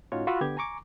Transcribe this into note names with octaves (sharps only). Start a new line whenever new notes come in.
A2 C#4 D#4 F4 F#4 C#5
F4 F#4 B5 E6
D3 B3 G4 G#6
G#5 A#5 C#6 D6